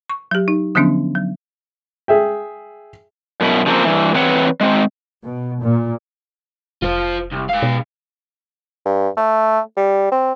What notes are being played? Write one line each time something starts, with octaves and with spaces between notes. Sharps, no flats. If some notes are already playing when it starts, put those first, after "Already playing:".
C#6
F#3 G4
D#4
D3 F3 F#3 B3 C#4 D4
F#3
G#4 E5 G5
F#2 B2 E4
C#3 F3 F#3 A3 A#3 C4
G2 E3
E3 C4 B4 C#5 F#5
G#3 C4
B2
A#2
F1 F4 C5
C2
G#2 F5
B2
G2
A3
G3
C4